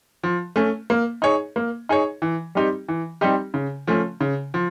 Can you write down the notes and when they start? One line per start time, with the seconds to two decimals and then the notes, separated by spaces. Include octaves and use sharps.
0.24 F3
0.56 A3 C#4
0.90 A#3
1.22 D#4 G#4 C#5
1.56 A#3
1.89 D#4 G#4 C#5
2.22 E3
2.55 G3 C4 D#4 G4
2.88 E3
3.21 G3 C4 D#4 G4
3.54 C#3
3.87 F3 A3 C#4
4.21 C#3
4.54 F3